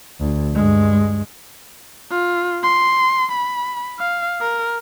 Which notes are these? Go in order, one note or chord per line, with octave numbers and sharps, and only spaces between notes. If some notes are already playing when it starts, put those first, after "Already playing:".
D2
G2 G#3
F4
C6
B5
F5
A#4